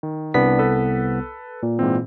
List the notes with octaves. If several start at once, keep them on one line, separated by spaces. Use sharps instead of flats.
D#3
C2 B3 D4 B6
A4 B4
A#2
G#2 E3 C4